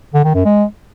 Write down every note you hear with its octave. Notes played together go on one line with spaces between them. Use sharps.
D3
D#3
F#2
G#3